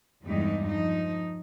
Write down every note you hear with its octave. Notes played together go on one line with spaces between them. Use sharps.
E2 G2 E3 G3 G#3 D#4
F3 D#4